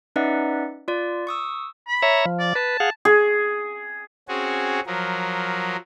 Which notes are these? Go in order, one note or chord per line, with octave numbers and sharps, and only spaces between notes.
C#4 D#4 B4 D5 E5 F#5
F4 D5
C#6 D#6 E6
B5
C#5 E5 A#5
F3
D5
B4 A5
G#4 F5 F#5
G#4
C4 C#4 F#4 G#4
F3 F#3 A#4